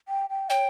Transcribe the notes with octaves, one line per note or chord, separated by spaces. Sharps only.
G5
G5
C#5 G5